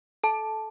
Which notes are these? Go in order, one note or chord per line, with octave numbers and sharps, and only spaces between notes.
A4 A5